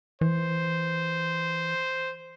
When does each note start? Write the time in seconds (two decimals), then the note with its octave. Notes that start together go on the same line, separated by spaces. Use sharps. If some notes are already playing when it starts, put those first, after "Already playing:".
0.21 E3 C5